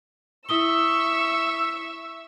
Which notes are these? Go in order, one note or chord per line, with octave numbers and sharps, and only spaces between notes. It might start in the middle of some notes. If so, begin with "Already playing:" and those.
E4 E5 C#6 D#6 E6 G7